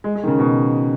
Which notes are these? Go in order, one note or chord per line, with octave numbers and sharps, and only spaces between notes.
G#3
G#3
D#3
C#3
B2